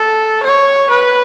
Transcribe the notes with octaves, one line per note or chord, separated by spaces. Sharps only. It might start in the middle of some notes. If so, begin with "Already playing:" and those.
Already playing: A4
C#5
B4